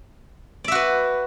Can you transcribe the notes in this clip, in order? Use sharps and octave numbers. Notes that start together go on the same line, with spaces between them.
F#4 B4 D5 E5